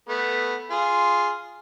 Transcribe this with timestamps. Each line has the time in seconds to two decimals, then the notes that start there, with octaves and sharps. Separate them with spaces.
0.09 A3 B3
0.70 F4 G#4